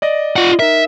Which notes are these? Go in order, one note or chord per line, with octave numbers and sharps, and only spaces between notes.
D5 D#5 A#6
F4 F#5
D#4 A#4 E5